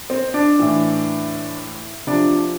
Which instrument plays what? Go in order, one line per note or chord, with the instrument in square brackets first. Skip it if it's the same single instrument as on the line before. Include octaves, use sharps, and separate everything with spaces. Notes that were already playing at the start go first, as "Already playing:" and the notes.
[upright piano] C4
D4
A2 E3
C3 F3 D4